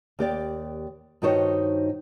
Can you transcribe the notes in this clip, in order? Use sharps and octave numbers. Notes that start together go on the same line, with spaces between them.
D#2 G4 D5
G2 D#3 D#4 F#4 C5 C#5